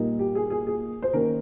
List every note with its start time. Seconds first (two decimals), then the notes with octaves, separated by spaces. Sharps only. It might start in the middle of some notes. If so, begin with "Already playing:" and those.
Already playing: A#2 G3 A#3 D#4
0.19 G4
0.35 G#4
0.50 G#4
0.67 G#4
1.02 C5
1.13 D#3 A#3 C#4 A#4